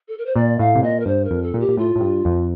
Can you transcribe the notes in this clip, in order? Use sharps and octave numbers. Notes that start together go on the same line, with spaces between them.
A4
A#4
C5
A#2 D5
A2 F5
C3
A#2 D#5
A#4
G2 C5
A#4
F2
A4
A#2
G4
A#2
A2 F4
A2
G2
F2